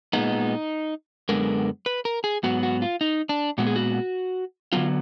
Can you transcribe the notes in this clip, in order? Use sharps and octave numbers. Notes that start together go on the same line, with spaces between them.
A#2 G#3 B3 D#4
F#2 D3 G#3 B3 A#4
B4
A#4
G#4
G#2 F#3 B3 F#4
F#4
F4
D#4
D4
A#2 G#3 B3 F#4
G#4
F#4
D3 F#3 B3 F4